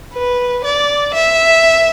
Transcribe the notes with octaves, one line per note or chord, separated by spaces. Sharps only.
B4
D5
E5